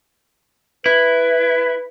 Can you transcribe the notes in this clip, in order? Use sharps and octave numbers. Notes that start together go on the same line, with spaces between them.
E4 B4